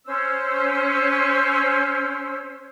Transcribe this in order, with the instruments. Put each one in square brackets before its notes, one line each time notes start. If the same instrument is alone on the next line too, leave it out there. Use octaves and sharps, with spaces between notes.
[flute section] C#4 C5 E6